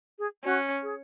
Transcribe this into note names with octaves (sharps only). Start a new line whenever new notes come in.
G#4
C#4 F#4
G#4